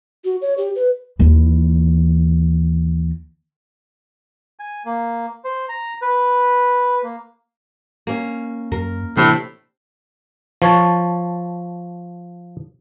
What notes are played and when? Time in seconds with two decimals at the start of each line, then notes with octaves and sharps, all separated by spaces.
0.25 F#4
0.42 C#5
0.58 G4
0.75 B4
1.19 D#2 E3
4.59 G#5
4.85 A#3
5.44 C5
5.69 A#5
6.02 B4
7.03 A#3
8.07 A#3 C#4
8.72 F#2 A#4
9.17 A2 C3 E3 A#3 C4 D4 G4
10.62 F3 C#5 A5